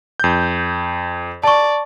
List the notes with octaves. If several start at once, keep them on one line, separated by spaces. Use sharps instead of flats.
F2 G6
D5 A5 C#6